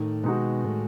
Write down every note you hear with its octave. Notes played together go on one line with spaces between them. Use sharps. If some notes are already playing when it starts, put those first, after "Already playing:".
Already playing: A2 D#3
B2 G#3 D#4 F#4
A2 D#3